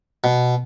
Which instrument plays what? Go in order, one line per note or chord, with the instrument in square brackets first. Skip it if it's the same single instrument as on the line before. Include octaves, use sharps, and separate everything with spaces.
[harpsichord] B2